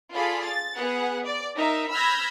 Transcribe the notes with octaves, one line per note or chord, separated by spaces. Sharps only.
F4 G#4 A4 D5 B5
A6
B3 G#4 F#5
D5
D#4 A#4 E5
B5 E6 F6 G6 G#6 A#6